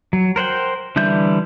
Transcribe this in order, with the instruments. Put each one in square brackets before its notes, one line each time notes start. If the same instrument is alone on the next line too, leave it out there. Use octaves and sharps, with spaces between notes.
[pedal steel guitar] F#3
A#4 C5 F#5 G5
D3 E3 G3 E5 G6